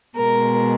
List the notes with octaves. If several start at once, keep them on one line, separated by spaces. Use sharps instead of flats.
B2 G#3 A#4